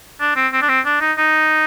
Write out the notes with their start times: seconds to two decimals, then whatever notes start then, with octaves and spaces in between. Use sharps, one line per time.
0.20 D4
0.36 C4
0.53 C4
0.62 D4
0.69 C4
0.86 D4
1.01 D#4
1.18 D#4